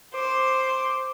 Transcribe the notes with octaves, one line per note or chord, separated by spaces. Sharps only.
C5 D6